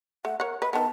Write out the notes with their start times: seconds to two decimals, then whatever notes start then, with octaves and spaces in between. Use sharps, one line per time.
0.25 A3 F#5
0.40 A#4 C#5 F#5
0.62 B4 D#5 B5
0.73 D#3 B3 A5